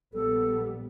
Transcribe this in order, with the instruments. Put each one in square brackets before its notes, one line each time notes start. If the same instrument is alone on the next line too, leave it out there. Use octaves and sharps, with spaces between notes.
[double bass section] A#1 G3 B3 [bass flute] A4